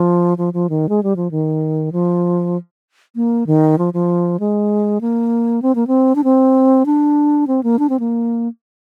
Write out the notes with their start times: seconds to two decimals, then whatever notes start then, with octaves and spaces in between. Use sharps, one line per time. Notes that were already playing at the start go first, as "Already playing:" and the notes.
Already playing: F3
0.38 F3
0.53 F3
0.70 D#3
0.89 G#3
1.03 G3
1.16 F3
1.31 D#3
1.92 F3
3.16 A#3
3.47 D#3
3.78 F3
3.94 F3
4.40 G#3
5.01 A#3
5.62 C4
5.75 A#3
5.87 C4
6.15 D4
6.24 C4
6.86 D4
7.47 C4
7.63 A#3
7.79 D4
7.89 C4
8.00 A#3